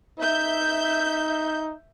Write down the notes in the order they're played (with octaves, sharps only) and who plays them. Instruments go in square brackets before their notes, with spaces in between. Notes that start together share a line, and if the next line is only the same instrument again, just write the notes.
[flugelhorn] D#4 [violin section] E5 G6